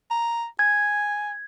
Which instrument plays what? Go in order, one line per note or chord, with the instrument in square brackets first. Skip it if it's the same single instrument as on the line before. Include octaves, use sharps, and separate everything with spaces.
[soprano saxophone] A#5
[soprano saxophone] G#5 [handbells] G#6